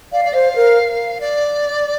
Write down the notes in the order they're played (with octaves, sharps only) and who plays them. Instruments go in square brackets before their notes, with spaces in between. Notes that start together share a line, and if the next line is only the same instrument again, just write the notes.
[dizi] D5 [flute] F5
[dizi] D5
[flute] C5 [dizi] F5
[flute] A#4
[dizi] D5